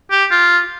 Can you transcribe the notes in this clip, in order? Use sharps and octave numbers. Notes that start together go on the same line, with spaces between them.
G4
F4